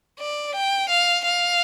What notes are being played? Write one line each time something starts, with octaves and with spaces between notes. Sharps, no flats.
D5
G5
F5
F5